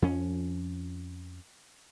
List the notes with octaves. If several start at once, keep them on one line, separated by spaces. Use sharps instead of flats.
F2 F3 C#4